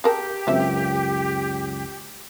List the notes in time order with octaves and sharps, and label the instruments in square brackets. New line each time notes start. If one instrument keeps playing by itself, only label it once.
[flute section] G4 [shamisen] G#4 A#4 A5
[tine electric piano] C#2 F#2 [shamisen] F3 C4 E5